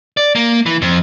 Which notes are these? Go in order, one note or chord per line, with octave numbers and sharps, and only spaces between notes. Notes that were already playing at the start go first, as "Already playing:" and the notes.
D5
A#3
E3
F2